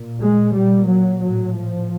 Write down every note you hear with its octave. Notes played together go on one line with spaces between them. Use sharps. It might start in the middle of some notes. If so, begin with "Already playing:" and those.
Already playing: A#2
G#3
A#2 G3
F#3
A2 F#3
F3